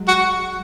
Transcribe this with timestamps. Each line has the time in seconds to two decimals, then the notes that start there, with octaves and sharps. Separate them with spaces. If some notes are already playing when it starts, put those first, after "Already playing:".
Already playing: F#3 G#3
0.08 F#4